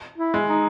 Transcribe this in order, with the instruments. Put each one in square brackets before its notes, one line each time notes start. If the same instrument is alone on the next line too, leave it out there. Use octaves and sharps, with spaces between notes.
[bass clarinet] E4
[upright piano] G#3
[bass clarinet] D#4